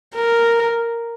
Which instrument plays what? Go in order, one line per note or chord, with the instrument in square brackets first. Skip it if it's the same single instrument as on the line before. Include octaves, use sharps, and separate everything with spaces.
[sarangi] A#4